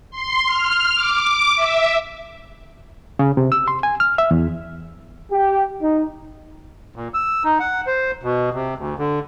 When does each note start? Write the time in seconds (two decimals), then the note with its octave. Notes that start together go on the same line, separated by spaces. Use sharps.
0.11 C6
0.47 F6
0.95 D6
1.55 E5
3.19 C#3
3.37 C3
3.52 E6
3.68 C6
3.83 G#5
4.00 F6
4.18 E5
4.31 E2
5.32 G4
5.81 D#4
6.96 A#2
7.14 E6
7.44 D#4
7.60 F#5
7.87 C5
8.24 B2
8.54 C3
8.78 D2
8.99 D3